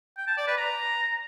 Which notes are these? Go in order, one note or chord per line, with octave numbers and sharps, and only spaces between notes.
G5
A5
D5
B4
A#5